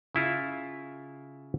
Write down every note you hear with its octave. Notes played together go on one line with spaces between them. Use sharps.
C#3 E4 F4